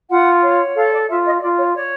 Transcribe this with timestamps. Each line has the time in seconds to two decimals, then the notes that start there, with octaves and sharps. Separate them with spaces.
0.09 F4 F#5
0.42 C#5
0.76 A4 F5
0.92 D5
1.09 F4 E5
1.25 D#5
1.37 D#5
1.41 F4 D5
1.58 C#5
1.75 C#5 D5